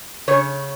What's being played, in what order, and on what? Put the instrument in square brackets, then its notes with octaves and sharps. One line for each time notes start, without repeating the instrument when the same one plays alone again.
[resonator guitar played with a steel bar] C#3 C#5